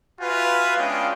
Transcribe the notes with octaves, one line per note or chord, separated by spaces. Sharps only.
F4 F#4 B4 E5 F5 G#5
G#3 B3 C#4 D4 F4 G5